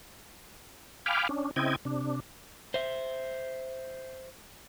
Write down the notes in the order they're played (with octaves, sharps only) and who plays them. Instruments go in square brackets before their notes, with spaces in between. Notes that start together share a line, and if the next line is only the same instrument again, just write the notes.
[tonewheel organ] F5 G5 G#5 B5 D6 F6
C#4 D4
C#3 C4 E4 D#5 G5 G#6
C3 D4
[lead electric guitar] C5 E5